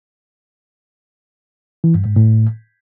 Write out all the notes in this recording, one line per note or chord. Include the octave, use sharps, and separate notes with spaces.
E3
G2
G#2
A2